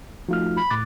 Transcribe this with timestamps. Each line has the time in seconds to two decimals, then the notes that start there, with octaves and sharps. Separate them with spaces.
0.29 F3 A3 D#4 F4 F#4 F6
0.57 B5
0.70 A2 D6 F#6 A6